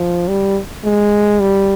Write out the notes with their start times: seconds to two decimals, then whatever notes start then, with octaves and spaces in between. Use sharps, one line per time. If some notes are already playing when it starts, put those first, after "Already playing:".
Already playing: F3
0.28 G3
0.84 G#3
1.41 G3